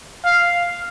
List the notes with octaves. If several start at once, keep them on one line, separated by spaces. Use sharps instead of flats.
F5